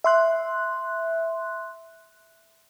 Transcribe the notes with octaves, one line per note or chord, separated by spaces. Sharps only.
E5 C6 F#6